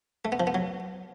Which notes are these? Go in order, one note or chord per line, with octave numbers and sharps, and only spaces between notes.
A3
B3
F3
B3
F#3